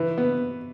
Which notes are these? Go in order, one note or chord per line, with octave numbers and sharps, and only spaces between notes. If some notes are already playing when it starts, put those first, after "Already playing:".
Already playing: E3
B3